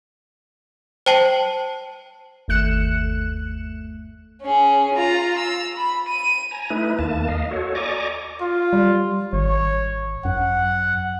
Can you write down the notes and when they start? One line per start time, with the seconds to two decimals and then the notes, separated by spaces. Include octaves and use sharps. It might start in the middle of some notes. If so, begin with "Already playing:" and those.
1.06 C5 G5 A5 C7 F#7
2.48 G1 D#2 A3 F#6 C#7 E7
4.42 C#4 G#4
4.94 F4 A#5
5.39 E6
5.77 B5
6.09 D#7
6.51 G#5 A#5
6.70 A3 D#4 E4 B4
6.99 D#2 A#3 A5
7.28 D#5 F5
7.51 F#4 A4 C#5
7.75 D5 D#5 G#5 A#5 C#6 D6
8.41 F4
8.73 G3
9.33 G#1 C#5
10.25 F#2 F#5